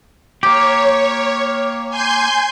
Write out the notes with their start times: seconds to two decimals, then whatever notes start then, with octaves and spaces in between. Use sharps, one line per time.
0.43 A#3 G4 C#5
1.89 G#5 C6 G6